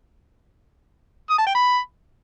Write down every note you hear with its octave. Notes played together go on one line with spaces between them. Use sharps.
D#6
A5
G5
B5